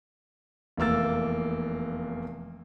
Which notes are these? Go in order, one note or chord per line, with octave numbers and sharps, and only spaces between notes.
F1 E2 A#3 E6 A6